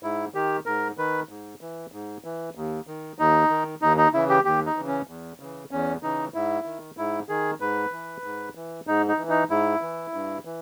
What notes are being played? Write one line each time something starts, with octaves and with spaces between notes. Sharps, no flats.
G#2 E4
D#3 G4
G#2 A#4
D#3 B4
G#2
E3
G#2
E3
D#2
D#3
D#2 D#4
D#3
D#2 D#4
D#4
C#3 E3 E4
G4
D#2 G4
D#4
C#3 E3
C#4
E2
C#3 E3
E2 C#4
C#3 E3 D#4
G#2 E4
D#3
G#2 E4
D#3 G#4
G#2 B4
E3
G#2
E3
G#2 D#4
D#4
E3
D#4
G#2 E4
E3
G2
E3